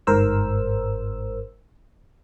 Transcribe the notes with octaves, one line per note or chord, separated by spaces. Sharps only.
G1 G#2 A#4 C5 E6